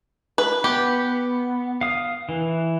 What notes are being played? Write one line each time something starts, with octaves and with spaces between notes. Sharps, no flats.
B4
B3 G4
F5 D#6
E3